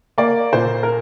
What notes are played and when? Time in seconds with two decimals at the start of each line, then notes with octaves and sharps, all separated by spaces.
0.18 A#3 D5
0.53 A#2 C5
0.83 A#4